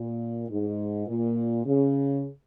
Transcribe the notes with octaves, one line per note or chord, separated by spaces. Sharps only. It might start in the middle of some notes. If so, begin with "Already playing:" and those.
Already playing: A#2
G#2
A#2
C#3